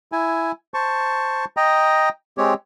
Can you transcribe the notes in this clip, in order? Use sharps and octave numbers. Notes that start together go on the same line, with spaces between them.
E4 G#5
C5 A5 C#6
D#5 G5 A#5
G#3 C4 G4 C#5